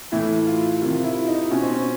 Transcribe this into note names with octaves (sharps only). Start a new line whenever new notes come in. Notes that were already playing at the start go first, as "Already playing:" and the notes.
A2 E3 E4
F4
C3 D#3 F4
E4
D#4
B2 C#4
C4
C#4